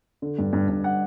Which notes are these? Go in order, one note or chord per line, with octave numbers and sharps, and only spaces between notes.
D3
G2
G2
G2
F#5